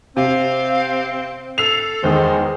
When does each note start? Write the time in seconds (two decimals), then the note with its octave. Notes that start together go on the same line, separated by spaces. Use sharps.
0.17 C3 C4 F5
1.58 A4 E6 C7 F7
2.03 E2 D#3 G#3 C5 D#6